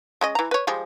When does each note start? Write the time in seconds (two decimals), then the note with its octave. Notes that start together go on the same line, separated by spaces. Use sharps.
0.21 G#3 C#4 D#5
0.35 E3 A#5
0.51 B4 C#5
0.67 F3 G3 G#3